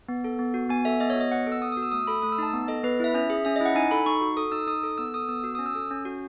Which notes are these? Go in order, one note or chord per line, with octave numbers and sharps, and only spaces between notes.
B3
A4
B3
F#4
B3 G#5
A4 E5
B3 D#5
C#5
F#4
D#5
B3 F#5
A4
E6
B3 D#6
D#6
F#4
E6
A3 D#6
A4 B5
A3 D#6
E6
D#4 A5
B3
A4 D#5
B3 B4
E4 E5
C#4 E5
G#4
C#4 E5
D#5
E4 F#5
D#4 G#5
A4 B5
D#4 C#6
F#4
A4 D#6
D#4 E6
D#4 D#6
A4
B3 E6
A4 D#6
B3 E6
F#4 E6
C#4 D#6
E6
A4
C#4
F#4